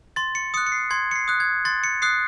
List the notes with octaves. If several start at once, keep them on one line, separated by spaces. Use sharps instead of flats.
C6 A6
C#7
D#6 F#6 C#7
C#7
C7
C6 G#6
C#7
C7
D#6 F#6
G#6
C6 A6
C#7
D#6 F#6 C7